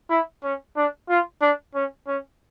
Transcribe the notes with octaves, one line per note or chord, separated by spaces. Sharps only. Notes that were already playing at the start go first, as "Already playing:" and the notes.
E4
C#4
D4
F4
D4
C#4
C#4